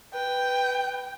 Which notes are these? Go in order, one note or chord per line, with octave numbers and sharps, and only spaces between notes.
B4 G5